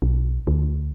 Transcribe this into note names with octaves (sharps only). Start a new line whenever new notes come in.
B1
D2